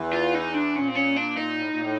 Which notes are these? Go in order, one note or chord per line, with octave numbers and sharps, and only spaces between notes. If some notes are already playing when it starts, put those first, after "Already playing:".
Already playing: E2 E3
F4
D#4
D4
A#2 C#4
C4
C#4
D4
D#4
A2
A#2
A2